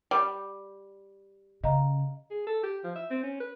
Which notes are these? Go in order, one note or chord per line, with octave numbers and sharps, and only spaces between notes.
G3
C#3 D#5 F5 A#5
G#4
A4
G4
F3
E5
C4
C#4
B4